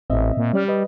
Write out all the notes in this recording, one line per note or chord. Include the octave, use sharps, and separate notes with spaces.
A1 C4 D#5 E5
A#2
G3 C#4 D5 F6
B4 D#5